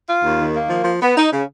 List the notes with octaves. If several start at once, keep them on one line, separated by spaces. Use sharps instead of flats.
F4
D#2
D#3
A#3
F3
F3
B3
D#4
C#3